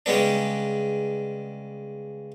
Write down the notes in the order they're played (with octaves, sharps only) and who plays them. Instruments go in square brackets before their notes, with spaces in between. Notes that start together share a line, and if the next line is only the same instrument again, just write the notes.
[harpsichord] C#3 G3 G#3 B3 D4